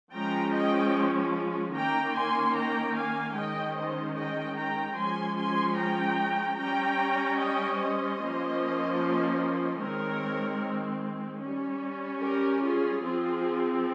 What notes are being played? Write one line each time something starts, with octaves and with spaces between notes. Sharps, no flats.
F3 G#3 C#4 G5 A#5
D#5 G5
D#3 A#3 C#4 G5 A#5
G#5 C6
G5 A#5
F5 G#5
D#3 G#3 C#4 D#5 G5
C5 D#5
D#5 G5
G5 A#5
F3 G#3 C#4 G#5 C6
G#5 C6
G5 A#5
G3 C#4 G5 A#5
D#5 G5
C5 D#5
F3 A#3 C#4
D#3 G#3 C4 A#4 C#5
C#4
G3
G4 A#4
F4 G#4
F3 C4 F4 G#4